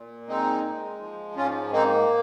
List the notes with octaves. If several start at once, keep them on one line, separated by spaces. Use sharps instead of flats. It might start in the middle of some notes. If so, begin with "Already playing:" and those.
Already playing: A#2
G#3 C4 D#4
G#3
F3
G#2 C#4 F4
A#3 C4 D#4